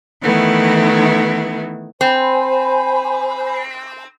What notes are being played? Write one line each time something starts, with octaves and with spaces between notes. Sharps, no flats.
D#3 E3 A3 B3 E4
C4 C5 G#5 B5